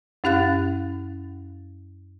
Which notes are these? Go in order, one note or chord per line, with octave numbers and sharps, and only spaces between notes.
F#2 C#4 G4 F5 F#6 A6